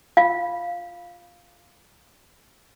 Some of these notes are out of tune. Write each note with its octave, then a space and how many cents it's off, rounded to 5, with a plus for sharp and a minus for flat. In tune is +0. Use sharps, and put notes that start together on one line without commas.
F4 +0 F5 +0